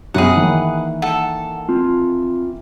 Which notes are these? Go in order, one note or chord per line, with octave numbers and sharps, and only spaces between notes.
F#2 B2 G#4 B4 F#5
D#3 E3 A#3
A4 F#5
C4 F4